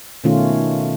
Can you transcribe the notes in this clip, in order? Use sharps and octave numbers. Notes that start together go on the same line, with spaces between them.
B2 D#3 A3 C#4 F4